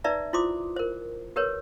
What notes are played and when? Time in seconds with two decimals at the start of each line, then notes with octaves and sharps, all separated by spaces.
0.04 D#4 B4 D5 E5 A#5
0.33 E4 F4 C5 C6 D6 D#6
0.76 A#4 C5
1.36 G4 A#4 B4 C#5